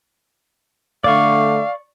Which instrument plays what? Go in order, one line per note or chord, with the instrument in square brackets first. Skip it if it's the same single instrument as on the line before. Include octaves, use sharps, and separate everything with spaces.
[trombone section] D3 A3 [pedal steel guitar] D5 C#6 [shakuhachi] F5